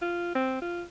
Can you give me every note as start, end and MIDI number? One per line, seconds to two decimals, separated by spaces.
0.02 0.34 65
0.35 0.61 60
0.62 0.83 65